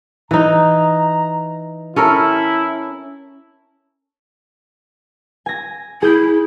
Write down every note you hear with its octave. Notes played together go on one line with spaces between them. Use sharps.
E3 D#4 A#5
C#4 E4 A4 A#4
G#5 A#6
E4 G#4 G6 B6